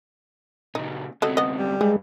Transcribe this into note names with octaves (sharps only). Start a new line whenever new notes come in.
A#2 C#3 D#4
D2 C3 F#3 A4 D#5
B3 D#5
G3
G2 G#3 G#4